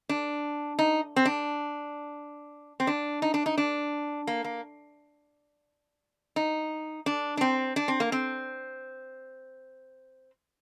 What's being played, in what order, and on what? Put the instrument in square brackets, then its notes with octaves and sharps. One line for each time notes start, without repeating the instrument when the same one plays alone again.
[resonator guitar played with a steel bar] D4
D#4
C4
D4
C4
D4
D#4
D4
D#4
D4
A#3
A#3
D#4
D4
D4
C4
D4
C4
A#3
C4